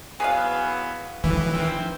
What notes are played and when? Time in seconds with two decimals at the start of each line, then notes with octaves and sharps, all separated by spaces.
0.20 E3 F#3 B3 G#4 B4 F5
1.24 A2 E3 F3 D4
1.53 D#3 C4